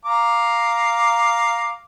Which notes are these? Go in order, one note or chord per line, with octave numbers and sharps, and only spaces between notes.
F5 A#5 D6